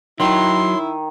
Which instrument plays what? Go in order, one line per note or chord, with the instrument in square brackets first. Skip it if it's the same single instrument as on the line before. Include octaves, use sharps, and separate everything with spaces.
[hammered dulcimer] D#3 [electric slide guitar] F#3 [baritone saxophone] E4 [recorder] C6